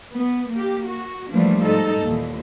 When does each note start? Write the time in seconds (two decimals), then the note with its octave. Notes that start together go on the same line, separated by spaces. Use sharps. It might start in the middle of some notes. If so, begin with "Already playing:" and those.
0.15 B3
0.53 A#3 G4
0.87 F#4
1.31 E3 F3 G3 A3 A#3 D4
1.63 G#2 D#4 A4
2.03 D#2 A#2 E3